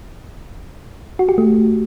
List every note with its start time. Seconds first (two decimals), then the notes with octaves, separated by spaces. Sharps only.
1.19 F#4
1.29 G4
1.38 A3